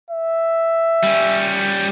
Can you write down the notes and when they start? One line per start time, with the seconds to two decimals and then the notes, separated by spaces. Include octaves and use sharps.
0.10 E5
1.03 G3 C#4